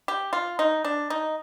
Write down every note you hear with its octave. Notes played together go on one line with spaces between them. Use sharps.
G4
F4
D#4
D4
D#4